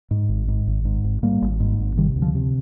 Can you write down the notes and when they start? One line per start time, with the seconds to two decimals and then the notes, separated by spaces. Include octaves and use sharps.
0.11 G#2
0.29 G#1
0.48 G#2
0.67 G#1
0.85 G#2
1.04 G#1
1.23 G#2 G3 A#3
1.42 G#1
1.60 G#2
1.79 G#1
1.97 C3 D#3 G3
2.16 D2
2.22 D3 F3
2.35 C3